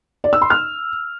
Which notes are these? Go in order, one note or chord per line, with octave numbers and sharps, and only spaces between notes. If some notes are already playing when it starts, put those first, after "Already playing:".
D5
E6
C6
F6